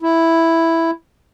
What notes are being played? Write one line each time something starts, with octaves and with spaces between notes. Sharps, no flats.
E4